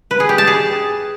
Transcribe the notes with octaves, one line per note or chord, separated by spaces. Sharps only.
B4
G#4
G4
A5
G#4